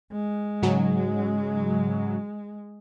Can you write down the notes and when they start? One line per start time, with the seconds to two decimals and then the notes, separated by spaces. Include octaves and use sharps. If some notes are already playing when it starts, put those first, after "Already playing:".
0.12 G#3
0.62 G#2 C#3 F#3